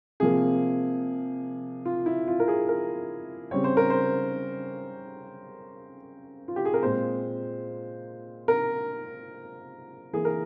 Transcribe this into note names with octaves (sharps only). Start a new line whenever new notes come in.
C3 F3 A#3 G#4
F4
E4
F4
A#4
G#4
A#4
C#3 G3 C4 C#5
C5
A#4
C5
F4
G4
G#4
A#4
A#2 G#3 C4 C5
A#4
E3 A#3 G#4
A#4